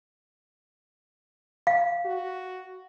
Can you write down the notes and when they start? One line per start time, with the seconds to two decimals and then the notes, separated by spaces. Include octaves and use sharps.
1.67 F5
2.06 F#4